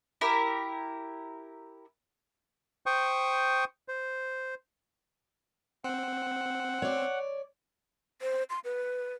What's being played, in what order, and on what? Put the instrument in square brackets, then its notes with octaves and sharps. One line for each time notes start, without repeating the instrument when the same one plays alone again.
[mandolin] E4 G4 A#4
[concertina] C5 G5 C#6 D#6
C5
[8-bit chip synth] C4 [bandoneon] F#5
[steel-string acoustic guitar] C#5 D5
[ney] C5
C6
B4